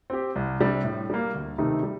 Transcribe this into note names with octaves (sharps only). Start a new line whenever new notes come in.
C4 G4
C2
C3 G3 D4
A2
G3 A#3
D2
C3 D#3 A3 D#4
G3